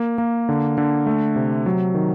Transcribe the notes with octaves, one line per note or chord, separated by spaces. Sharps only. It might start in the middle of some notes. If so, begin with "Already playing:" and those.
Already playing: A#3
A#3
D3
D3
A3
C3
F#3
D#3